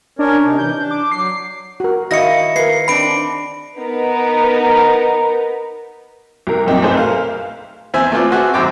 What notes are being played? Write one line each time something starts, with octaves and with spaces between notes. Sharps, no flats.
C#4 D4 A#4 C#5
C3 D#4
E3 G6
D4
D6
F#3 C7
F#4 A#4
D#3 A#3 E4 F#4 D#5 C#6 A#6 C#7
G#4 A#4 B4 C7
C4 D4 D#4 B5 D7
B3 D#4 A#4 B4 A#5
C2 A#4
F#2 A#2 C4 D#4
B1 A3 G#4 B4 C5
A#4 F5
E2 C4 E5 G#5
A3 B3 F4 D5
C4 F#4 G#4 E5
G#1 F#2 G5 D6